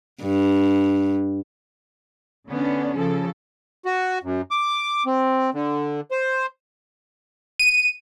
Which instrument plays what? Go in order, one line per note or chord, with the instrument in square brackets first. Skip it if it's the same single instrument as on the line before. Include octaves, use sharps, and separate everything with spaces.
[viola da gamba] G2
[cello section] D3 B3 C#4 D4
C#3 F3 A4
[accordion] F#4
F#2
D6
C4
D3
C5
[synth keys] D#7